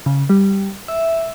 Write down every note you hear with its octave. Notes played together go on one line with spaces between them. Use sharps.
C#3
G3
E5